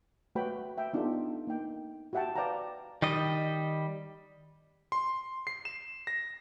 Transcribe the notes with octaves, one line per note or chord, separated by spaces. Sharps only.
A3 F#4 B4 C#5 G5 B5
E5 G5
B3 D4 D#4 F4 G4 A4
A#3 D#4 G5
F#4 G4 E5 F#5 G5 A5
B4 D5 F5 G5 A5 A#5
D#3 G3 D#5
C6
C7
E7
A#6